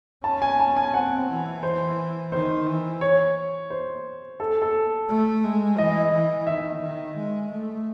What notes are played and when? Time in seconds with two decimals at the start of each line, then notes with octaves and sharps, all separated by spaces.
0.24 C#4 A5
0.42 G#5
0.60 A5
0.77 G#5
0.93 C4 F#5
1.28 E3
1.63 C5
2.32 D#3 C5
2.66 E3
3.01 C#5
3.70 C5
4.40 A4
4.62 A4
5.08 A3
5.44 G#3
5.77 E3 D#5
6.13 E3
6.47 D#3 E5
6.82 D#3
7.16 G#3
7.51 A3